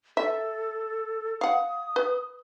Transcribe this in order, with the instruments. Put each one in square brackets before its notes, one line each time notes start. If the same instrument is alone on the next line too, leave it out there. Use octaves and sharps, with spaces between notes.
[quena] A4 [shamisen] E5
[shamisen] F5 F#5 [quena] D#6
[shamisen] B4